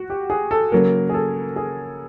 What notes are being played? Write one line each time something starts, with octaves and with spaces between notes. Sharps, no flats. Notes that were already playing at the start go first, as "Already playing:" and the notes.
Already playing: F#4
G4
G#4
A4
C#3 F#3 A#3 A#4
G#4
A4
G#4